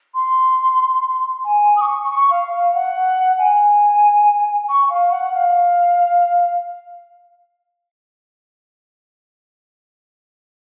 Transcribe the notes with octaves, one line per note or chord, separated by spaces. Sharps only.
C6
G#5
D#6
C#6
C#6
F5
F5
F#5
G#5
C#6
F5
F#5
F5